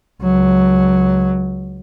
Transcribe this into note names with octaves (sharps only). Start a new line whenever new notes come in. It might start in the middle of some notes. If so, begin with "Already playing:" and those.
C#2 F#3